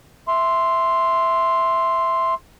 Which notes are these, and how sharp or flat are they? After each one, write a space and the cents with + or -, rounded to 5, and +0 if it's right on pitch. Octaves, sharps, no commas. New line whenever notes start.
E5 +0 C6 +0